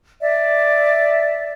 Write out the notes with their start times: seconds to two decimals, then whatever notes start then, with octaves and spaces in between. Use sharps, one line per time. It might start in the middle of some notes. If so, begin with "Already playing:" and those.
0.20 D5 E5